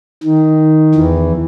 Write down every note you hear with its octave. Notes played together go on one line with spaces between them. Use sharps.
D#3
E2 E3